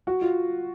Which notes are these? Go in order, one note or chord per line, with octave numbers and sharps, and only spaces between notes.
F#4
F4